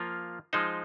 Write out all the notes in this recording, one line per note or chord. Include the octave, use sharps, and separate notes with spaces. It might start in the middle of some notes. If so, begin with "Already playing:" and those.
Already playing: F3 A#3 F4
F3 G#3 D#4 C5